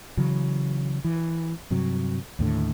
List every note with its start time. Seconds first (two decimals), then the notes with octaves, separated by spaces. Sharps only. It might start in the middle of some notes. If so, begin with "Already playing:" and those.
0.17 C#3 E3 F#3
1.04 E3
1.70 G2 C3 F#3
2.39 D#2 A2 D3